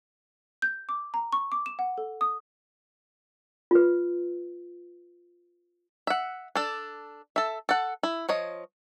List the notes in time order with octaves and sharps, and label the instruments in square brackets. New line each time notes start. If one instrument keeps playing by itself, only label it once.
[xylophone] G6
D6
A#5
C#6
D6
E7
F#5
A4
D#6
[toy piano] F4 B4
[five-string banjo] E5 F#5
D4 A4
A4 E5
A4 F#5
E4
F3 C#5 D#5